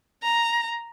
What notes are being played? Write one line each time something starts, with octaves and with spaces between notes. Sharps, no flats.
A#5